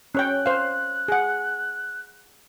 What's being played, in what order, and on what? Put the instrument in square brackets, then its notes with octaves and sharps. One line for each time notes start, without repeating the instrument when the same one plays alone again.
[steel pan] C#4 C#5 G5 [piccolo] F#6
[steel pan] C5 F5
G#4 F#5